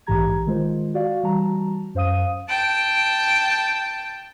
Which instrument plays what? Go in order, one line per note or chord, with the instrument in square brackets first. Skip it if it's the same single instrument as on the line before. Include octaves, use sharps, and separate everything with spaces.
[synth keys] A#1 G#2 E3 G4 A#5 G#6
D#3 G#3 F4 C5
F#4 D5 F5
E3 G3 F#4 A5 A#5
F#2 C5 F5 D#6 D#7
[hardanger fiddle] G5 A5 [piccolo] D7